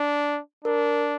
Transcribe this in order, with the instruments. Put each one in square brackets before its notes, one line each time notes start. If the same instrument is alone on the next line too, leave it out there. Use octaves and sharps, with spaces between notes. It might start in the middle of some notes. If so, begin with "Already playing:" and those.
Already playing: [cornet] D4
[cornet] D4 [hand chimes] A#4